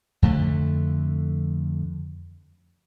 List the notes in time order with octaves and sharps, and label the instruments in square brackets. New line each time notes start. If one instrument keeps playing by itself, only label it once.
[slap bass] F2 D3 A3